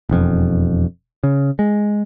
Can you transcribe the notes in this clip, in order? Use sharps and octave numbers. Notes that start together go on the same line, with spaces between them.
E1 F2
C#3
G#3